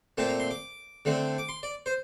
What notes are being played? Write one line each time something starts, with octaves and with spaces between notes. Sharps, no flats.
A#2 A3 C4 A5
A#5
C6
D6
D3 A3 C4
D6
C6
D5
C5